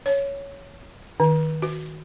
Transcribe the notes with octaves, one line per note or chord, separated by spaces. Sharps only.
C#5
D#3
F#4